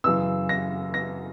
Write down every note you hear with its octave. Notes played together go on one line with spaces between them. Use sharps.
F#2 C#3 E3 E6
A#6
A#6